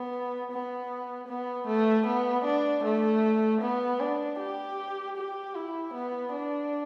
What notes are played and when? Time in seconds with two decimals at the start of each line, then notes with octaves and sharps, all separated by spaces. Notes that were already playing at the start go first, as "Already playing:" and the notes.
Already playing: B3
0.52 B3
1.28 B3
1.67 A3
2.06 B3
2.45 D4
2.84 A3
3.62 B3
4.00 D4
4.39 G4
5.17 G4
5.55 E4
5.94 B3
6.33 D4